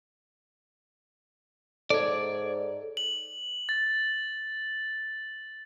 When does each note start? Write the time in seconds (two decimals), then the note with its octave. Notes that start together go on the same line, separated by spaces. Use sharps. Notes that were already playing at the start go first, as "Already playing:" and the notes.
1.90 G#2 A4 C#5 D5
2.97 F#7
3.69 A6